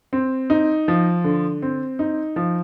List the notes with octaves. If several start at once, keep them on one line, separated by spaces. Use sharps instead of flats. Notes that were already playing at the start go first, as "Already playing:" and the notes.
C4
D#4
F3
D3
C4
D#4
F3